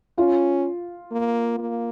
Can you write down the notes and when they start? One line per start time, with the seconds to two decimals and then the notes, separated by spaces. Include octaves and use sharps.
0.18 C#4 F4
1.11 A#3
1.58 A#3